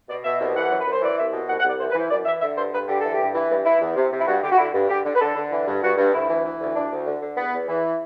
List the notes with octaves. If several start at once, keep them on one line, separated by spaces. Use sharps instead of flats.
B2 D5
B2 E5
C2
E3 F#5
F#2
B4
F#2
C5
E3 D5
C2 E5
B2
C2 F#5
F#5
C2
D5
E3 C5
B4
E3 C5
F#2 D5
E3 E5
D3 E5
G2 C5
G2 B4
D3 G4
E3 A4
G4
G2
E3
G2
E3 E4
E2
C3
C3
E4
G2 F#4
D3 G4
F#4
D3 E4
G2
D3 G4
D3
B4
D3 A4
D3
E3
G2
G2 F#4
G2
D2 E4
E3
E3
D2
D2 D4
D2
D3
D3
E2 B3
E2
E3